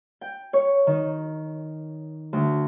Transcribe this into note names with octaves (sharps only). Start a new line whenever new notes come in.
G5
C#5
D#3
D2